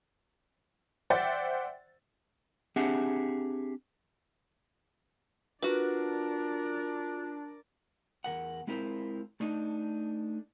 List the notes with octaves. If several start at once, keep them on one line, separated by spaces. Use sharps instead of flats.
C5 D5 E5 F#5 G5 A6
C4 D4 G4 G#4 E5 F#5
D4 F4 F#4 A#4 B4 D5
E2 D#3 A#4 F#5
G#3 C4 E4 F4 A#4 C5
A3 D4 D#4 D#5